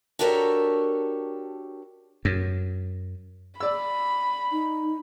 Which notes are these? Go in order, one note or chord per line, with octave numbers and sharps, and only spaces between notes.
D4 F#4 G4 A4 A#4 C#5
F#2
D5 B5 E6
D#4